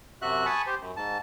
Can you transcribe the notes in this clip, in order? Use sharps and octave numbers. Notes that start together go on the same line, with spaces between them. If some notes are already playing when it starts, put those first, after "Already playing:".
F#2 C3 F#4 E5 F#6
G#5 A5 B5 C#6 D#6
G4 C5
F#2
G#2 A5